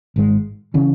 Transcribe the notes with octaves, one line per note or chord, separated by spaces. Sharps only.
G#1 G#2 G#3
C#3 E3 C#4